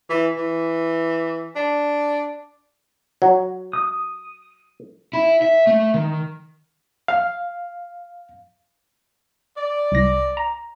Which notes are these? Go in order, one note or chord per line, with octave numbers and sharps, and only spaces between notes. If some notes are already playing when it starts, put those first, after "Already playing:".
E3
E3
D4
F#3
D#6
E4
E5
A3
D#3
F5
D5
C2 A#6
A#5